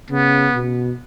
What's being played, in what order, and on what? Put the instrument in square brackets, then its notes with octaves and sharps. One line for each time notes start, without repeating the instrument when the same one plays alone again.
[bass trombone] C#3 [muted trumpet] B3
[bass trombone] B2